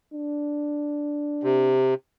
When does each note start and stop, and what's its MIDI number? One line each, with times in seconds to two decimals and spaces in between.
0.13 1.79 62
1.43 1.94 48